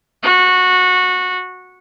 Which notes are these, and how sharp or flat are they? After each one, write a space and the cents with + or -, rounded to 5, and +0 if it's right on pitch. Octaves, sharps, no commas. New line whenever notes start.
F#4 -15